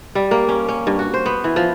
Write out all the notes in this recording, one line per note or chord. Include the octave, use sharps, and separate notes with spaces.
G3
A#3
C#4
C#4
G2
F#4
C5
B3
E3
F3